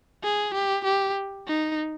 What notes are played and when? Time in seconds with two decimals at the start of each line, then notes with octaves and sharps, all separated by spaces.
0.23 G#4
0.54 G4
0.85 G4
1.48 D#4